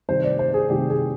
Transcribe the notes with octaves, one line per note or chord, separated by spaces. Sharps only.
C3 D#3 G3 C5
D5
C5
G#4
C3 D#3 G3 G4
G#4